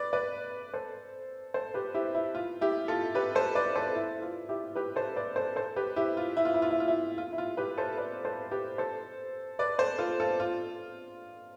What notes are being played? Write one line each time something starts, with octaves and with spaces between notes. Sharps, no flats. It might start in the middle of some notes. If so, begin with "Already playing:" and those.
Already playing: B4 D5
B4 D5
A4 C5
A4 C5
G4 B4
E4 G4
E4
F4
E4 G4
F4 A4
G4 B4
A4 C5
B4 D5
A4 C5
E4
F4
E4 G4
G4 B4
A4 C5
B4 D5
A4 C5
A4 C5
G4 B4
E4 G4
F4
E4
F4
E4
F4
E4
F4
E4
F4
E4
F4
G4 B4
A4 C5
B4 D5
A4 C5
G4 B4
A4 C5
B4 D5
A4 C5
F4 A4
F4 A4
F4